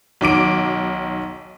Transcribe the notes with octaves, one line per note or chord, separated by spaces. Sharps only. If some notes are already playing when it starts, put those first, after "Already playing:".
B1 D#3 D6 D7